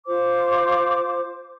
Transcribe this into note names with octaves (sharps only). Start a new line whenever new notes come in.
F4 C5 D6